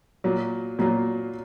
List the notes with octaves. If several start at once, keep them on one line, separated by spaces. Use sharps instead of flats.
A#2 F#3 A#3
A#2 F#3 A#3